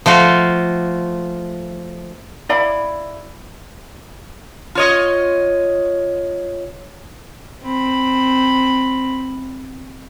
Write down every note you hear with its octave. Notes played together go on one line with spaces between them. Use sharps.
F3 A3 F4 F#4
E4 D5 F5 B5
F4 C#5 D#5
C4 B5